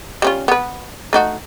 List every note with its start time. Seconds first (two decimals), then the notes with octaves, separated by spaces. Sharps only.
0.22 G3 C#4 F4
0.48 B3 B4
1.13 A3 D#4 F#4